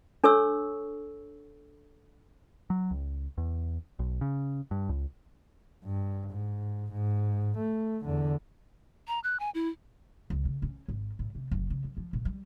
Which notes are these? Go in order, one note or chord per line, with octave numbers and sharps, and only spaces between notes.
D4 A4 C#5 C#6 E6
F#3
C#2
E2
B1
C#3
G2
C#2
G2
G#2
G#2
A3
E2 D3
A#5
F#6
G#5
E4
C#2
C#3
C#4
G#1
A2
C3
F#1
C#3
F#2
F3
A#2
G3